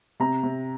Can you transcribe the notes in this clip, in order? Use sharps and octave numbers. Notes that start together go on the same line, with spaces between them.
C3 A#5
C3